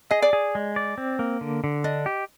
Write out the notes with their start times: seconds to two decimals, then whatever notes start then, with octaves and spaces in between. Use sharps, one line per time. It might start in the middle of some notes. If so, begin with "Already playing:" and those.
0.11 G#4 D#5
0.22 D5
0.33 G#4
0.55 G#3
0.76 D5
0.98 C4
1.19 A#3
1.41 D3
1.64 D3
1.84 D4 D#5
2.06 G4